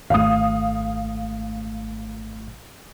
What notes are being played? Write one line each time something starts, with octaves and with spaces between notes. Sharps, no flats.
G#1 A3 F5 D#6